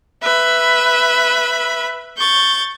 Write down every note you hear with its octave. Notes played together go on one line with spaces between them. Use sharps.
B4 E5 B5
C#6 G6 A6